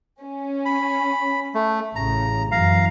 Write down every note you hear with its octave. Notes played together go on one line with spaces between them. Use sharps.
C#4
B5
A3
A1 C#3 A#5
F#2 E3 F5 A#5